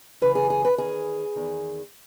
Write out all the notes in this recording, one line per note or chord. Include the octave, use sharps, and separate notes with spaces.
F#2 C#3 E3 B4
G#4
G#4
B4
E2 D#3 G#4
E2 D#3